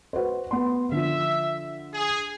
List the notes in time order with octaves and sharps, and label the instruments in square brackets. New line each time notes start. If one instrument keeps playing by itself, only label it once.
[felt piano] F#4 B4 C5
B3 C6
[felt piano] D3 F3 [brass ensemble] E5
[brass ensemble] G#4